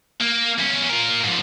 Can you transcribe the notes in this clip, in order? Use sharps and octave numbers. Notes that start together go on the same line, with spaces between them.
A#3
E2 C#4
F4 A#4
G#2 F3